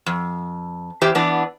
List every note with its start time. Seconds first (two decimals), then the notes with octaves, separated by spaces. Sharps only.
0.06 F2
1.02 E2 G4 C5 E5
1.15 E3 B3 D4